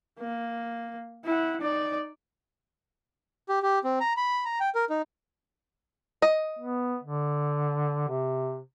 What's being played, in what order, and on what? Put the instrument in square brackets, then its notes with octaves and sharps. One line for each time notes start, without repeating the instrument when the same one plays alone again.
[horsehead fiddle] A#3
E4 F#5
D#4 D5
[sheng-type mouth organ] G4
G4
C4
A#5
B5
A#5
G5
A#4
D#4
[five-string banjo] D#5
[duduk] B3
D3
C3